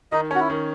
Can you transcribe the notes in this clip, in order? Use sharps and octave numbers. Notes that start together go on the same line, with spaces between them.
D#3 D#4 D#5
C#4 F#4
E4
D#3